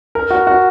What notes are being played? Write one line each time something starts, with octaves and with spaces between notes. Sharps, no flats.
A#4
F#4
F#4